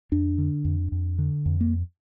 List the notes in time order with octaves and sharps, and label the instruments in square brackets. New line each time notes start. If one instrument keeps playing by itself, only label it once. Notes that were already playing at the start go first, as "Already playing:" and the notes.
[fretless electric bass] F2 D4
D3
F2
F2
D3
F2
A#3